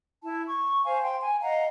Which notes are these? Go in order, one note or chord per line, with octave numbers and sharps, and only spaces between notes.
E4 A5
C#6
C5 F5 G#5
G5 C6
G#5
D#5 F5 F#5 A#5